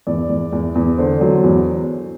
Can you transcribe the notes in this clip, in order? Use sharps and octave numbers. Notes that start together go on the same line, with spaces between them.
E2 D5
E2
E2
E2
D3 C5
F#3
E2